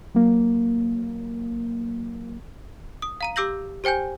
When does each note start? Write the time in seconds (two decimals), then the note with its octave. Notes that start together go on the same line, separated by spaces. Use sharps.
0.15 F#3 A#3
3.02 D#6
3.21 F5 A#5 D#7
3.36 G4 D6 E6 G6 A#6 F#7
3.84 G4 C5 G5 G#5 G6